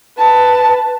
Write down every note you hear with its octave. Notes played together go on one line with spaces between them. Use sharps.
B4 A5